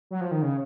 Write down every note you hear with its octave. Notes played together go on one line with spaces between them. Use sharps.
F#3
F3
D#3
C#3